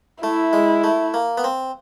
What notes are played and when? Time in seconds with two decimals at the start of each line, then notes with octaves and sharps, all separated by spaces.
0.23 A3 E4
0.53 G#3
0.84 A3
1.14 A#3
1.38 B3
1.44 C4